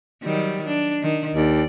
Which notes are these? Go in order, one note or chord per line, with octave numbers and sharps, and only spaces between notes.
D#3 F#3 G3
D4
D#3
D#2 D5